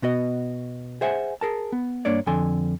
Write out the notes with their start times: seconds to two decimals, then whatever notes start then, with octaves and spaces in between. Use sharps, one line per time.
0.02 B2 B3 F#4 D#5
1.01 G#4 C5 E5 F#5 G#5
1.41 G#4 A#4 A5
1.72 B3
2.05 G2 A#3 D4 C#5 D5
2.27 F2 D3 A4 G#5 C6